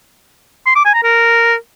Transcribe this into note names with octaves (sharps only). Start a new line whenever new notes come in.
C6
D6
G#5
A#5
A#4